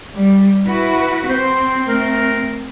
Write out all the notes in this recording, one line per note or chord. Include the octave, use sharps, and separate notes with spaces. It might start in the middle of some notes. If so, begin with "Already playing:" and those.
G3
E4 F#4 B4
C4 C5
A3 A#4